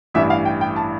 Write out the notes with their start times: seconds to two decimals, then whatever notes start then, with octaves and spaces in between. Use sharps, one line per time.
0.14 A1 G2 E3 E5
0.30 F5
0.45 G5
0.61 G5
0.76 A5